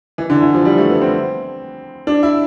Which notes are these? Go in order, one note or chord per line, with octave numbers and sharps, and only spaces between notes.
E3
D3
E3
F3
G3
A3
B3
C4
D4
E4